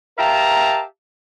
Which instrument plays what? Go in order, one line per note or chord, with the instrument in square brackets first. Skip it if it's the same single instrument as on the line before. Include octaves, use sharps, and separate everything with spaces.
[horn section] G4 A#4 E5 F5 A5 A#5